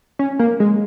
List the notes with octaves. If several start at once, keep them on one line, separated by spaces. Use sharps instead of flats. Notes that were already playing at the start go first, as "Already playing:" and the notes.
C#4
A#3
G#3